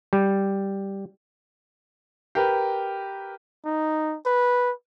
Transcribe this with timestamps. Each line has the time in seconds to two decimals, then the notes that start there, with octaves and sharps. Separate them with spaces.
0.13 G3
2.35 G4 A#4 B4
3.65 D#4
4.26 B4